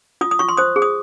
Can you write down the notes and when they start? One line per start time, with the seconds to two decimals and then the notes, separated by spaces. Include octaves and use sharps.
0.21 F4 D#6
0.31 D#6
0.39 F4 C#6
0.49 C6
0.57 C5 D#6
0.76 G#4
0.82 D#6